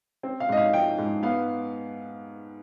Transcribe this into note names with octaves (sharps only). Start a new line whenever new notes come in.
C4
F5
G#2 D#5
F5
F3 G5
G#2
B3 F5